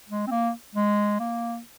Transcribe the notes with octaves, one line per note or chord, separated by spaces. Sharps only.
G#3
C4
A#3
G#3
A#3